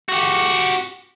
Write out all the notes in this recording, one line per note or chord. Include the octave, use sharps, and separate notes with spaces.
F#4 G4